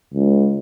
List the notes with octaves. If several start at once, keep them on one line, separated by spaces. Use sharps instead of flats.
C#2